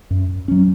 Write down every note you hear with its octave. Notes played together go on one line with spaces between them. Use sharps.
F#2
F#3 C#4